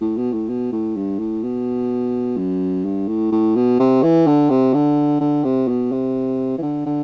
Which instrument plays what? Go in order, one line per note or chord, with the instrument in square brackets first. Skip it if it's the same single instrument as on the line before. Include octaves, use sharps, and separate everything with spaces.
[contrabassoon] A2
B2
A2
B2
A2
G2
A2
B2
F#2
G2
A2
A2
B2
C3
E3
D3
C3
D3
D3
C3
B2
C3
E3
D3
D3